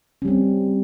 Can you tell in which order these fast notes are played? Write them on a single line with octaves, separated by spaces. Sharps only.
C#4 G3 C4